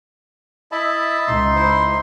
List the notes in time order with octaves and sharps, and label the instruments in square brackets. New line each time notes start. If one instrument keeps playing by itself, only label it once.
[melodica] E4 B5 [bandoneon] D#5 E5 A5
[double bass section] C#2 [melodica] D#4 C6
[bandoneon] E4 C5